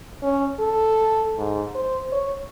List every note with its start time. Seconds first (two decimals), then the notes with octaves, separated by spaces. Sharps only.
0.23 C#4
0.60 A4
1.38 G#2
1.75 C5
2.12 C#5